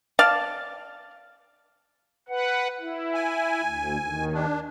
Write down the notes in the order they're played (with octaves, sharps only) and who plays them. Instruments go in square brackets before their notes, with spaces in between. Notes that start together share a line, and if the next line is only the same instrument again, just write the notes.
[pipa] D5 F5 A5
[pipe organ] B4 F#5
E4
[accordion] G#5
[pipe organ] D2
D#2 D#3
[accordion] D4